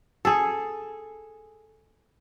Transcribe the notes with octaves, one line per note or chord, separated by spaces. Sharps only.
G#4 A4